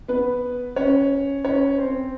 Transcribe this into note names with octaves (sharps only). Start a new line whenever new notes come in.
B3 B4
C#4 C#5
C#4 C#5
C4 C5